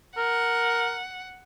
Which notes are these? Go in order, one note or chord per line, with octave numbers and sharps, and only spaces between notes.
A#4 F#5